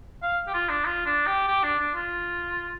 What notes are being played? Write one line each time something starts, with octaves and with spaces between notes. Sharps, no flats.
F5
G4
F4
D4
F4
D4
G4
G4
D4
D4
F4